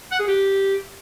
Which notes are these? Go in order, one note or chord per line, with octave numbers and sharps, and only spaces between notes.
F#5
G#4
G4